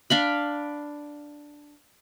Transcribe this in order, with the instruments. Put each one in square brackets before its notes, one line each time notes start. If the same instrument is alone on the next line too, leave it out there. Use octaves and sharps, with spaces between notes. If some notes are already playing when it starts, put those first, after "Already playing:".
[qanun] D4 F5 B5